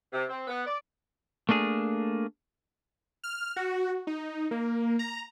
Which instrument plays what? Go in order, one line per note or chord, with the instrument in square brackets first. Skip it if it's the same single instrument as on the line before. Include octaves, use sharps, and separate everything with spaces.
[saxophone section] C3
C4
B3
D5
[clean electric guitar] A3 A#3 D4 G#4
[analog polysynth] F6
F#4
D#4
A#3
A#5